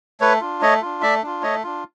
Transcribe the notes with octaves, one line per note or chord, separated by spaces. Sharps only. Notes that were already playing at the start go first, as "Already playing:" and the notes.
A3 B4 C#5
D4 F4
A3 C#5 D#5
D4 F4
A3 D5 E5
D4 F4
A3 C#5 D#5
D4 F4